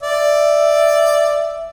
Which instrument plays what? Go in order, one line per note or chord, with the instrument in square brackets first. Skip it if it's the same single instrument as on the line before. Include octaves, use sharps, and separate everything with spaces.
[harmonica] D5 [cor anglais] E5